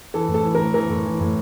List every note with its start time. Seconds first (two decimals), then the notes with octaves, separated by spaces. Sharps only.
0.14 E3 A4
0.28 A2
0.34 A4
0.44 E3
0.55 A2 A#4
0.74 E3 A#4
0.89 A2
1.05 E3
1.20 A2